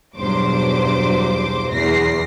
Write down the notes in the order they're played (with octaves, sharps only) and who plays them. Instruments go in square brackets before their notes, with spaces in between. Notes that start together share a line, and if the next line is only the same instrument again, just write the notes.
[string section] B1 E2 G2 F#3 C5 D6
E2 A#6 C7